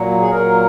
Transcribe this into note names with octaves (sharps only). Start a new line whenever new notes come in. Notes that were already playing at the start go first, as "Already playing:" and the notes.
Already playing: A#2 F#3
G#4
A#2 F#3 A#4